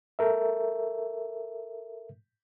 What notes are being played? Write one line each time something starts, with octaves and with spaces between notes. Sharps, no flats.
A4 A#4 E5